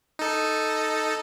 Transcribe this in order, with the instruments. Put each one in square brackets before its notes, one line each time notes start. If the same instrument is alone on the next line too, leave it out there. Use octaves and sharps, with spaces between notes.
[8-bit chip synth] D#4 A4